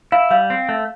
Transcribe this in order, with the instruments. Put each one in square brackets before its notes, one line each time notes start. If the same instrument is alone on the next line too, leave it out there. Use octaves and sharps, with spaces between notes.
[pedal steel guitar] E4 [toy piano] F5
[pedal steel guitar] G3 [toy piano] F5
[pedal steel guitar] C4
A3